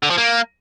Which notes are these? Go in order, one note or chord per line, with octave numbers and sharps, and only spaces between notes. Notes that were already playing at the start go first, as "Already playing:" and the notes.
D3
F3
A#3